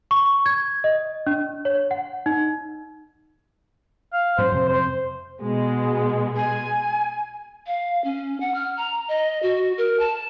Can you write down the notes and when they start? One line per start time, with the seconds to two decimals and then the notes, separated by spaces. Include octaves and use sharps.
0.11 C#6
0.46 G#6
0.84 D#5
1.27 D4
1.65 C#5
1.91 F#5
2.26 D#4
4.13 F5
4.38 G#2 F#3 C#4 C5
4.52 F2 C3
4.69 C5
5.42 B2 G#3
6.37 G#5
7.67 F5
8.04 C#4
8.40 F#5
8.55 F6
8.77 A#5
9.08 D#5
9.43 F#4
9.78 A#4
10.00 A5